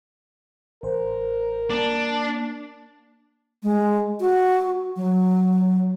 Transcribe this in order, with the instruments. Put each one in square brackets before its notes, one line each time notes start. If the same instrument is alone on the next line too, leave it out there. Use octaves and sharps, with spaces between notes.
[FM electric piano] A1 C5 [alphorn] A#4
[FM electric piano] A#3 [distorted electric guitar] D4
[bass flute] G#3
F#4
F#3